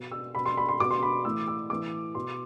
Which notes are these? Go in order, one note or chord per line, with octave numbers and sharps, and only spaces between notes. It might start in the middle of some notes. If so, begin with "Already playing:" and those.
Already playing: B2
E6
B2 B5
C6
B5
C6
B2 D6
C6
B5
A2 E3 E6
E6
A2 E3 D6
B2 C6